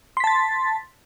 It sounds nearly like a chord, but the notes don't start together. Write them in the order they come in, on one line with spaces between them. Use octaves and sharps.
C6 B6 A5 A6